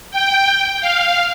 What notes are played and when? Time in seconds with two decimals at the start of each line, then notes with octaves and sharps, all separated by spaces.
0.11 G5
0.81 F5